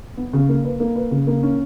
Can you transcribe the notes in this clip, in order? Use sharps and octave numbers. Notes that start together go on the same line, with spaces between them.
B3
C#3
A#3
B4
A#3
B4
C#3
A#3
C#4